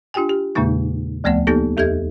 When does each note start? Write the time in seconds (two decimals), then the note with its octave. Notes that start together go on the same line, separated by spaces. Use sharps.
0.14 D4 F4 G4 G5 G#5
0.29 G4
0.55 E2 A#2 C#3 G#3 A#3 D#4
1.24 D2 F3 A3 B3 D5 F#5
1.47 A#3 B3 D#4 G4 A4
1.77 E2 G4 A4 D#5 E5 G#6